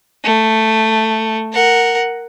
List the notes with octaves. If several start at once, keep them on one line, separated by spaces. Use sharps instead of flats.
A3
A#4 F#5